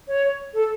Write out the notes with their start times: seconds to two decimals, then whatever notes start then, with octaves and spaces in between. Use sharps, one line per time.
0.08 C#5
0.54 A4